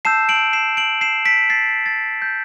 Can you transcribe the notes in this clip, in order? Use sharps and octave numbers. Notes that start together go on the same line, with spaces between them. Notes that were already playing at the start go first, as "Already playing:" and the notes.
A5 E6 G6 C7 E7
D7 F#7
C7 E7
D7 F#7
C7 E7
B6 D7
A6 C7
A6
G6